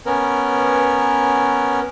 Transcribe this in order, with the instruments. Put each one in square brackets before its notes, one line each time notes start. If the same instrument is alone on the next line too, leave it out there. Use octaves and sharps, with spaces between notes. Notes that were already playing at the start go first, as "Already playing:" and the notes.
[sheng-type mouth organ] B3 C#4 A#4